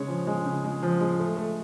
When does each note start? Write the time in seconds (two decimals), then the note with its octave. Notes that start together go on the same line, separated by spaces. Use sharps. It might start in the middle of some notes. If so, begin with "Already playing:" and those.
Already playing: C#3 G#3 C#5
0.08 F3
0.27 G#3
0.46 C#3
0.64 G#3
0.83 F3
1.01 G#3
1.20 A3
1.37 A3